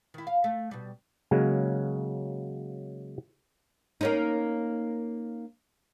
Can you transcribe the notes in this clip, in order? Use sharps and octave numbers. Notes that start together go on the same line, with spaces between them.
D#3 E4
F5
A3
B2 G3
C#3 F#3 G#3 A#3
A#3 C#4 D#4